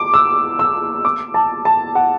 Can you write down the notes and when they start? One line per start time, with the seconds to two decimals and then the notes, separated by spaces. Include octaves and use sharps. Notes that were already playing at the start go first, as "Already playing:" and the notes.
Already playing: D6
0.14 E6
0.59 E6
1.05 D6
1.34 A5
1.65 A5
1.95 F#5